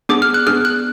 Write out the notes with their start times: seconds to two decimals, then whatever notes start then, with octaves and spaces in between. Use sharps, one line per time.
0.09 B3 D4 G#4 D6
0.22 F6
0.34 F#6
0.47 B3 D4 G#4 F6
0.65 F#6